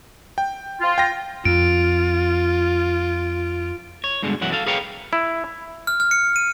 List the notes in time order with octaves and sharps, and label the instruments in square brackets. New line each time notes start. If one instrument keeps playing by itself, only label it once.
[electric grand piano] G5
[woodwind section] F4
[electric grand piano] G5 A#6
[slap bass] F2 [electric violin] F4 [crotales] D7
[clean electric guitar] C#5
G2 B2 D3 G#3
B1 F#2 E3 F#3 E4 F#5
A4 F5
G#4 B4 C#5 F5 G5 A#5
[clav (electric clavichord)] E4
[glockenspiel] F6
F6
C#7
D#7